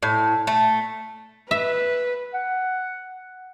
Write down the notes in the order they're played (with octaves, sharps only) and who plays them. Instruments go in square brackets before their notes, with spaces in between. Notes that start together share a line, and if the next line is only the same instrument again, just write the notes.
[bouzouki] A2
A3
[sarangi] B4 [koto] E5
[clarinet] F#5